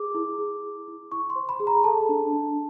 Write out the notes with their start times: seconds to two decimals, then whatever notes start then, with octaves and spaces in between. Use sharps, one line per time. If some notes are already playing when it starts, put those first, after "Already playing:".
Already playing: G#4 D6
0.15 E4
0.38 G#4
0.63 G#4
0.88 E4
1.12 E4 C#6
1.30 C6
1.35 C5
1.49 B5
1.60 G#4
1.67 A#5
1.84 A4 A5
2.09 D4
2.33 D4